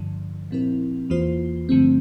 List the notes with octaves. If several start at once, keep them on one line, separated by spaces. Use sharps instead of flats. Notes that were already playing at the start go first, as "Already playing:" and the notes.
Already playing: G2 D3 F3
A#2 F3 C4 E4 A#4
E2 E3 A#3 F4 C5
G2 D3 F3 A3 C4